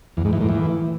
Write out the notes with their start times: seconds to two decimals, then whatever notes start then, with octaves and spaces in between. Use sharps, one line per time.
0.17 E2
0.25 G#2
0.33 E3
0.41 A2
0.49 E3